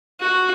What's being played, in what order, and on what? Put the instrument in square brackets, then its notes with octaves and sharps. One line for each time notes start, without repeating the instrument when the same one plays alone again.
[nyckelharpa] F#4